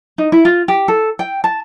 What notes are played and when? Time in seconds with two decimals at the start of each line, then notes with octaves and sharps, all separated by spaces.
0.18 D#4
0.32 E4
0.45 F4
0.68 G4
0.88 A4
1.19 G5
1.44 A5